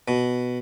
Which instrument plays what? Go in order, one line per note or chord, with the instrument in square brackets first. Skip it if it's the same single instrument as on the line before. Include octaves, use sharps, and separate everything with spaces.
[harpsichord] B2